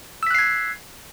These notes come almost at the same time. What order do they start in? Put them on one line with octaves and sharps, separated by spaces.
E6 B6 F#6 C7 G#6